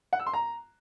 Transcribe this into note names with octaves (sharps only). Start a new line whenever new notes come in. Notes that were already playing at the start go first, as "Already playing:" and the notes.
F#5
E6
C6
A#5